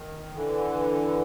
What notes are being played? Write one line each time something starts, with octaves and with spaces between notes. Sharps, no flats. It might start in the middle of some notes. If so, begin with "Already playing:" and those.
Already playing: D#3
D3 E3